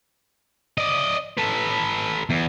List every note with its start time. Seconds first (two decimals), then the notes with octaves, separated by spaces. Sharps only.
0.78 D5 D#5
1.37 A4 B4
2.30 E2